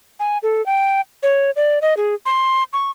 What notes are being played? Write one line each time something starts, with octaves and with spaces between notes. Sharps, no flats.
G#5
A4
G5
C#5
D5
D#5
G#4
C6
C#6